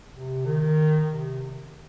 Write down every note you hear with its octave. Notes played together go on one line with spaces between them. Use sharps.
C3
D#3
C3